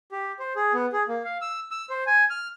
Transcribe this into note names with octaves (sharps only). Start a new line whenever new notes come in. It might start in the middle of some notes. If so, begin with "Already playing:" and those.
G4
C5
G#4
B3
G#4
A#3
F5
E6
E6
C5
G#5
F6